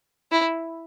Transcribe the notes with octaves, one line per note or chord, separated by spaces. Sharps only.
E4